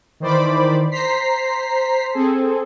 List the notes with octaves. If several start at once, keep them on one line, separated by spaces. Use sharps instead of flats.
D#3 E3 C5 D5 B5 D6
C5 A#5 B6 C7
C4 G#4 A4